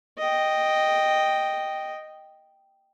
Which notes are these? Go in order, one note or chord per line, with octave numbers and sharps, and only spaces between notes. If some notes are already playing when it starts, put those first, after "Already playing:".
D#5 G5